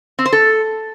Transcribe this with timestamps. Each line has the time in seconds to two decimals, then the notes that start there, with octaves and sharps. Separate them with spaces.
0.19 C4
0.26 C5
0.33 A4